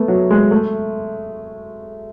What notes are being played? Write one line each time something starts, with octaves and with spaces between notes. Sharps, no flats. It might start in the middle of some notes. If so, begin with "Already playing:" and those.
Already playing: A3 B3
F#3
G#3
A3